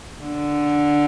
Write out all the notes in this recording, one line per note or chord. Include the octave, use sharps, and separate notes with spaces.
D3